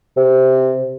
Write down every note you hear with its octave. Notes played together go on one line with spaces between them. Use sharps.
C3